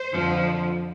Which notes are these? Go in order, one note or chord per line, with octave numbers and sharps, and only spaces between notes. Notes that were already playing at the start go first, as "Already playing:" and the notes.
Already playing: C5
F2 D3 F3